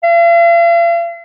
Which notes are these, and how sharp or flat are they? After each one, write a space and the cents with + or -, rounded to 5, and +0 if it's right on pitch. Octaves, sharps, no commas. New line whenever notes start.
F5 -45